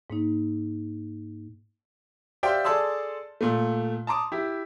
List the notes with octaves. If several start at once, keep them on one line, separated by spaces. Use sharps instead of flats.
G#2 A#3 D#4
G4 C5 D5 E5 F5 G5
G#4 A4 D5 A5 C6 E6
A#2 A3
A5 A#5 C6 D6 D#6
E4 G4 E5